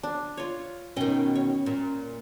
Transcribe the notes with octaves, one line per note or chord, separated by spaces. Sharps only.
D4
F4 C#5
B2 D#3 C#4 D#5 G5
C#5
A#2